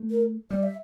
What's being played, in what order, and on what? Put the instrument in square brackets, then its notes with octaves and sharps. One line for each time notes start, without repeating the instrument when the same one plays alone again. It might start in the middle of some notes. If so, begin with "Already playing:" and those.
Already playing: [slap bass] A3
[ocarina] A#4
[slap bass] G3 [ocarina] D5
[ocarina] E5